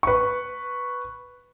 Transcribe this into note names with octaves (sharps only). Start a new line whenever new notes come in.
B4 C#6